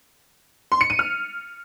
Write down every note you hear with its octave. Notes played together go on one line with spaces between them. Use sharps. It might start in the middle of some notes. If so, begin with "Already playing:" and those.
C6
C#7
D#7
F6